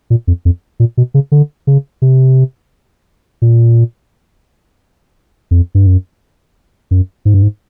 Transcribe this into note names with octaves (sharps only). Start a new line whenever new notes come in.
A#2
F2
F2
A#2
B2
C#3
D3
C#3
C3
A#2
F2
G2
F#2
F#2
G#2
G2
G#2